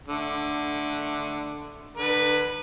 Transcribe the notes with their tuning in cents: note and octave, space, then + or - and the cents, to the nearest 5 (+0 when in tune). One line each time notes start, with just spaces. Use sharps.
D3 +10 A3 +0
D3 +40 B4 +0 B5 -35